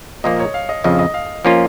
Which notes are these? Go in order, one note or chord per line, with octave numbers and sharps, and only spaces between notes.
A#2 F3 A#3 D#5
C#5
F5
D#5
F2 C#3 F3 D#5
D#5
F5
F3 A#3 C#4 F4